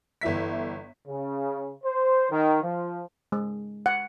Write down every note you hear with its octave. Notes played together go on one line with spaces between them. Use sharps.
G1 E3 E5 B6
C#3
C5
D#3
F3
G#3
F#5